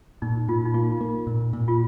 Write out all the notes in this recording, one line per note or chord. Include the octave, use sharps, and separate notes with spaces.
A#2 D#4
A#2 F4
D#4
A#3 F4
A#3
A#2
A#2
F4